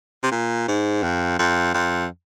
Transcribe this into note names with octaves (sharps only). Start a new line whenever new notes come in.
C3
A#2
G#2
F2
F2
F2